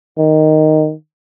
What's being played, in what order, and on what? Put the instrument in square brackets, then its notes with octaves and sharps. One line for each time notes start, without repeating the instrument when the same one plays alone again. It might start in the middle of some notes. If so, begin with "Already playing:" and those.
[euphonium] D#3